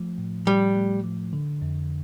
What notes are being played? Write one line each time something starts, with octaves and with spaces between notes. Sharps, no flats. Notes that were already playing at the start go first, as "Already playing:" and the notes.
Already playing: F3 A3
A2
A2 G3
A3
F3
D3
F2